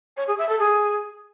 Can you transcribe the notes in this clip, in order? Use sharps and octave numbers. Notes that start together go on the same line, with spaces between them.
C#5
G#4
E5
A4
G#4